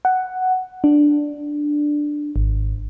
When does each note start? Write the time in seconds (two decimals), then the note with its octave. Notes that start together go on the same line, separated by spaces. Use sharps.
0.05 F#5
0.84 D4
2.36 G#1